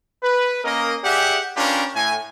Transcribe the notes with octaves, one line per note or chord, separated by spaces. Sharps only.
B4
A#3 C#4 A#4 D#5
G4 G#4 D5 E5 F#5
C#4 D4 F4 G4 A#4 B4
A2 G#5